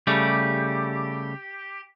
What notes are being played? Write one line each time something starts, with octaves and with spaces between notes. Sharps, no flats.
C#3 G3 A3 G4